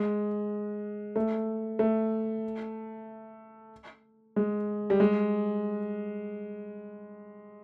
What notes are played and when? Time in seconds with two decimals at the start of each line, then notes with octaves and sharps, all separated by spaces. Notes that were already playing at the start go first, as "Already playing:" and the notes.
Already playing: G#3
1.16 A3
1.79 A3
4.36 G#3
4.90 G3
5.00 G#3